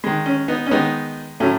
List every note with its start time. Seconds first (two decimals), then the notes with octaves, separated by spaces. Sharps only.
0.04 D#3 G#3
0.26 C#4
0.48 B3 D#4
0.66 C#4
0.71 D#3 G#3 B3 D#4
1.40 A2 F#3 A3 C#4